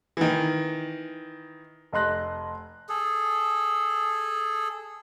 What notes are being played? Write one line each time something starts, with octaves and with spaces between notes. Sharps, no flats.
D#3 E3
F1 D#5 C6 F#6 A#6
G#4 A4